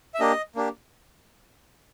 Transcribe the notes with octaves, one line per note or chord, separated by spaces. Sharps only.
E5
A#3 D4 G4 D#5
A#3 D4 G4